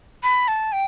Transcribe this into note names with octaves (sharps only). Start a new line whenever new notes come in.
B5
A5
G5